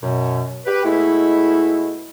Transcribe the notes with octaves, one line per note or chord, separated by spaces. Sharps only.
F#2 B2
G4 B4
B2 G#3 A3 E4